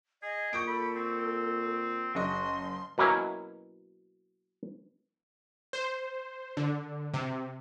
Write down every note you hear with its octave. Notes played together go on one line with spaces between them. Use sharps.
G#4 D#5
A#2 C#6 D#6 G6 D7
A4 B5
C4
F#1 F#4 D#5 C6
B2 F#3 A#3 C#4 E4
C5
D3
C3